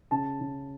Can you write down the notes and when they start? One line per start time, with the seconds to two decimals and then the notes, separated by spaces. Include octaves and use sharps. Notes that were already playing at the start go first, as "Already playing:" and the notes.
0.11 C#3 A5
0.41 C#3